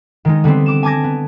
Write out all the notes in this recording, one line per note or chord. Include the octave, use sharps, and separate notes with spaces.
D#3 G#3 D#4
D3 G3 B3 C4
D6 E7
G#5 A5 D6 G#6 A#6
B3